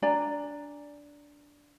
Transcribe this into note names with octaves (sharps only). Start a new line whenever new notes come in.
D4 D5 G#5 A#5